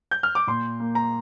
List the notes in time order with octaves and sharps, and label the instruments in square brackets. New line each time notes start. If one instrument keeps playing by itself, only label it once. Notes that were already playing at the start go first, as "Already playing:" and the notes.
[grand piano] G6
F6
D6
A#2 C6
A#3
A#5